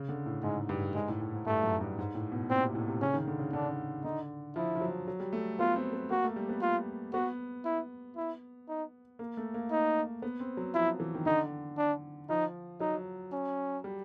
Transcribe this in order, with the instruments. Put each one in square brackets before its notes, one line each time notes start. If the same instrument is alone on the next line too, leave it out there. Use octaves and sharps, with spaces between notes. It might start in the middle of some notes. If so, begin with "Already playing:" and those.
Already playing: [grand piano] C#3
D3
A2
[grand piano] G#2 [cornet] G#3
[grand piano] G2
[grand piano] G#2 [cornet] G#3
[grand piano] A2
A2
G#2
[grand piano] G2 [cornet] A3
[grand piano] F#2
G2
G#2
A2
B2
[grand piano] A#2 [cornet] C4
[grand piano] C3
A2
C3
[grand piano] C#3 [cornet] C#4
[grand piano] D#3
D3
C#3
[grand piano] D3 [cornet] D4
[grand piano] D3 [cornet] D#4
[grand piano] F3 [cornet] E4
[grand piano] F3
F#3
F#3
G3
A3
[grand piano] B3 [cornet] F4
[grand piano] C4
B3
[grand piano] A#3 [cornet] F#4
[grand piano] A3
G3
B3
[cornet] F4
[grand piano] B3 [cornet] F#4
[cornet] E4
E4
D#4
[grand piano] A#3
A3
A#3
[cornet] D#4
[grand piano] B3
C4
F#3
[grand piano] F3 [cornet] E4
[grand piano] E3
D#3
[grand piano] D3 [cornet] D#4
[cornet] D4
[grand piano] F3 [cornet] D#4
[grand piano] F#3 [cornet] D#4
[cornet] C#4
[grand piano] G3